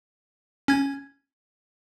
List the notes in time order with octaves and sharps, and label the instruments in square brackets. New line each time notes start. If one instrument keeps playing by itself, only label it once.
[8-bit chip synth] C#4 G#6